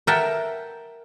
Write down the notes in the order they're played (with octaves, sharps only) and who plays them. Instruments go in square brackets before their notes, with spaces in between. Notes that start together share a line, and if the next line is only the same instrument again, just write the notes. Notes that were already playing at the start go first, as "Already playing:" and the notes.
[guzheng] A#4 E5 F#5 G5 A5